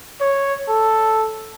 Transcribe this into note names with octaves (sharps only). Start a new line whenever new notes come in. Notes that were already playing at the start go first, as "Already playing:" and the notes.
C#5
A4